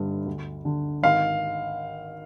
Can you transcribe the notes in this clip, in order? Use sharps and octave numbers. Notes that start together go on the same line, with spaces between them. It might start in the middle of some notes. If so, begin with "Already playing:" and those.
Already playing: G1 G2 D3
D2
D3
G#1 F5